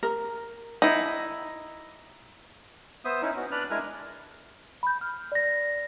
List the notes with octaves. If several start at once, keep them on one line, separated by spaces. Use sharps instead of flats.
A#4
D#4 E4
B3 C5 E5 D#6
C#4 D#4 E4
B3 C#4 F#4
D4 B4 D5 F6 F#6
G#3 D4 E4 A#4 G#5
B5 G6
F6
D5 A#6